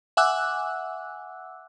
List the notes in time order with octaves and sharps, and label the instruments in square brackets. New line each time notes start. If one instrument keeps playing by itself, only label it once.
[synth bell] E5 F#5 G#5 D6 E6 F#6